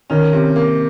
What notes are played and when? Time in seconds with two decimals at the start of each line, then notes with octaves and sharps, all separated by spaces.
0.10 D#3 C#4
0.33 C3
0.56 A#3